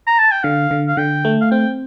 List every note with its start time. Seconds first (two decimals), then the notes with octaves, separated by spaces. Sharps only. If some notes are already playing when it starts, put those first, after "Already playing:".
0.07 A#5
0.19 A5
0.31 G5
0.43 D3 F5
0.71 D3
0.88 F5
0.97 D3 G5
1.25 A3
1.41 F5
1.51 C4 G5